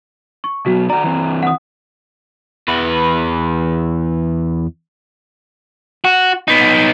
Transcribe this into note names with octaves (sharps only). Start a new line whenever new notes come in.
C#6
B2 F#3 F#4
F#4 D5 A#5
E3 C4
F#5 D#6
E2 B4
F#4
B3 D#4